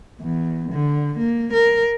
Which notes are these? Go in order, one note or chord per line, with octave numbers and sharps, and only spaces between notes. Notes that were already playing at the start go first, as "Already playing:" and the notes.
E2
D3
A#3
A#4